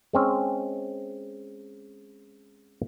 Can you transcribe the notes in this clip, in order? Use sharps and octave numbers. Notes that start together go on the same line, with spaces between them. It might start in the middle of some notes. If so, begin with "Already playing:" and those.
G#3 C4 C#4